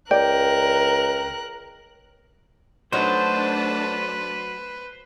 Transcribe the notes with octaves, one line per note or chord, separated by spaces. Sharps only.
C#2 A#4 D5 G5 F#6
F#3 A3 D4 D#4 B4 C5 A5